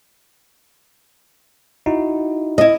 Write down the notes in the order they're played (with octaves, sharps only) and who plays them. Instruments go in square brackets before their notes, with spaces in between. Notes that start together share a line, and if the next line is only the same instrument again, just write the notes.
[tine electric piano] D#4 E4 F#4
[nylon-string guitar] E4 D#5